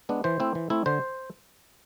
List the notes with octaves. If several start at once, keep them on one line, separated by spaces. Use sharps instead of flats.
G#3 B3 D4
E3 C5
A3 C4 E4
E3
A3 C4 E4
D3 C5